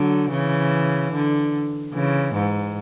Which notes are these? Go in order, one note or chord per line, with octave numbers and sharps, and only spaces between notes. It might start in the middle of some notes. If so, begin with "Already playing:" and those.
Already playing: D3 F#3
C#3 E3
D3
C#3 E3
G#2